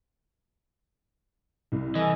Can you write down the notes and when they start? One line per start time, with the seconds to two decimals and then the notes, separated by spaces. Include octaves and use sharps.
1.72 C2
1.95 E3 A4 D#5 G#5